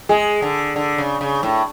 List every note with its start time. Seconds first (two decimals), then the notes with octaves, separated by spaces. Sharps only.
0.09 G#3 G#4
0.42 D3
0.76 D3
0.98 C#3
1.21 C#3
1.43 A2